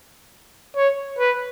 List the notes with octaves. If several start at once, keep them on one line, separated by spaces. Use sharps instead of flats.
C#5
B4